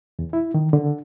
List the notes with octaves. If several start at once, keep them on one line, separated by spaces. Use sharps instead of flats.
E2
E4
D#3
D3